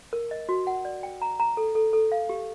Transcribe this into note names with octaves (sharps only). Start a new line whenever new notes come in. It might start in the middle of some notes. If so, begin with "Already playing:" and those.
A#4
D#5
F#4
F#5
D5
G5
A#5
A#5
A4
A4
A4
F5
G4